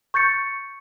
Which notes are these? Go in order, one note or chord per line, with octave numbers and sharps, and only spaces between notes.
C#6 G6 A6 C#7